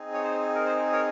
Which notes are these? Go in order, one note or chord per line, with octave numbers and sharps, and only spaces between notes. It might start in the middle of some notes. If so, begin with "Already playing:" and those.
Already playing: C4 D#4 G#4
C#5
C5
A#4
C5
A#4 C#5